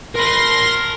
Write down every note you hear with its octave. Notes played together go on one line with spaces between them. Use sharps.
A#4 B5 C6 A#6